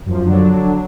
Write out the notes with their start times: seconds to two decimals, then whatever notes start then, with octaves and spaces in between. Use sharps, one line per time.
0.06 F#2 F3
0.26 D3 F#3 D4